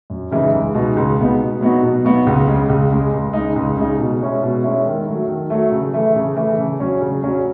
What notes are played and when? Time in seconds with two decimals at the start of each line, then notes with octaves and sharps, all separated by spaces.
0.10 F#2
0.31 C#3 E3 G#3 D#4
0.53 C#2
0.74 B2 G#3 B3 D#4
0.97 C#2
1.18 B2 G#3 B3 D#4
1.40 B2
1.61 F#3 B3 D#4 F#4
1.83 B2
2.05 F#3 B3 D#4 F#4
2.27 C#2
2.48 C#3 G#3
2.69 C#2
2.91 C#3 G#3
3.13 C#2
3.33 C#3 G#3 D#4
3.56 C#2
3.77 C#3 G#3 D#4
3.99 B2
4.20 G#3 C#4 E4
4.42 B2
4.64 G#3 C#4 E4
4.85 D#3
5.07 F#3 A3
5.28 D#3
5.50 F#3 A3
5.72 C#3
5.94 E3 A3
6.16 C#3
6.37 E3 A3
6.58 C#3
6.80 F#3 C#4
7.01 C#3
7.23 F#3 C#4